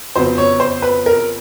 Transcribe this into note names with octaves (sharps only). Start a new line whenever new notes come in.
F2 C#3 F#3 B3 C5
C#5
C5
B4
A#4